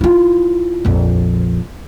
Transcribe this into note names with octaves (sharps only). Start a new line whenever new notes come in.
E4 F4
A#1 F2